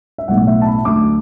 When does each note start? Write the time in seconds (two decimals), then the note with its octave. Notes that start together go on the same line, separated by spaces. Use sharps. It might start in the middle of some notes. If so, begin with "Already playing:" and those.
0.18 E5
0.28 B1 A2 A3 F#5
0.47 E5
0.62 A5
0.66 B5
0.85 D2 D3 F#3 A3 D6